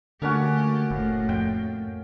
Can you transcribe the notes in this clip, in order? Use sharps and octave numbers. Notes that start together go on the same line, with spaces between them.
D3 A3 A#3 C#4 F#4 G4
F1 A2
F2 G5